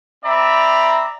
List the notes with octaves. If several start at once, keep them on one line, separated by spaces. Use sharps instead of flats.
C4 D5 E5 A#5 B5